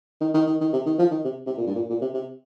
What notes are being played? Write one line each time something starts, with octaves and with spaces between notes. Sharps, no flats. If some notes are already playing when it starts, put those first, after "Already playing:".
D#3
D#3
D#3
D#3
C3
D#3
F3
D#3
C3
C3
A#2
G2
A#2
A#2
C3
C3